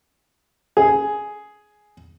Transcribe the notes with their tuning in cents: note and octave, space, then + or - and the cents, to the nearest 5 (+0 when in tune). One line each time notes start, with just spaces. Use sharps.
G#4 +5